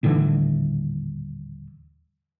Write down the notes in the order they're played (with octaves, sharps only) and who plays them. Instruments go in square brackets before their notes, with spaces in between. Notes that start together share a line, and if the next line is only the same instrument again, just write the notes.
[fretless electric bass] D#1 A2 D3 E3